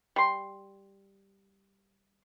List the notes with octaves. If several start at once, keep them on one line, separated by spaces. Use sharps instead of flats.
G3 C6